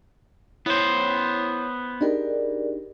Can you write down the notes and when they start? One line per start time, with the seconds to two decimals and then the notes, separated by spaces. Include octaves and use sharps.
0.66 B3 E4 C5 C#5
2.01 D4 D#4 G4 G#4 A#4 D5